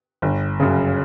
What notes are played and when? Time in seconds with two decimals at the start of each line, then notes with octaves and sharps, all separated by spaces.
0.22 G1
0.60 F#2 C#3